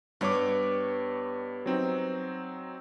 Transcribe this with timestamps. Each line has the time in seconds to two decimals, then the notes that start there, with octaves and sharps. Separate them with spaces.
0.21 G2 G3 B3 C#5 D6
1.66 F#3 C4 D#4